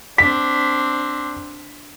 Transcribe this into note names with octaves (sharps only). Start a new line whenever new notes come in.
C4 D4 B6